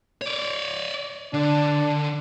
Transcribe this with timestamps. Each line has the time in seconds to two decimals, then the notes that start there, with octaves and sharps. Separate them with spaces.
0.22 C#5 D5
1.34 D3 D4